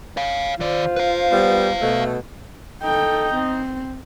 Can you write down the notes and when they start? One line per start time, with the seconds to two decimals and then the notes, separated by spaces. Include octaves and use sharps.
0.17 C#5 F5
0.60 D#3 F4 C5 D5
0.96 B4 F5
1.31 G3 B3
1.81 B2 A3
2.83 D#4 A4 G5
3.34 C4